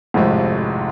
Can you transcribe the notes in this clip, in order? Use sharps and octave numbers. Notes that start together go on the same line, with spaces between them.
G#1 F2 A2 C3 G#3